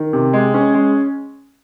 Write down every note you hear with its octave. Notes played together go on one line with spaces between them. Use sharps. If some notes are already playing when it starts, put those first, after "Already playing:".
Already playing: D#3
C3
G#3
C#4
G#3